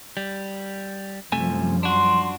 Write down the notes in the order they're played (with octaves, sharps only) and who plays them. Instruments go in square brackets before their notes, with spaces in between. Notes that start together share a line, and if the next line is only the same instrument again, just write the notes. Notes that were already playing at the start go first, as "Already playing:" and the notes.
[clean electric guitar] G3
[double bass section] F#2 F3 G3 [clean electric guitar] C3 A3 G#5
[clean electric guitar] D4 F#4 [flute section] C6